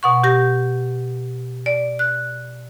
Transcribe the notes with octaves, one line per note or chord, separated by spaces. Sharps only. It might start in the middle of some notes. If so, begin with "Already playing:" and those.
B2 F#5 C#6
G4 A#6
D5
F#6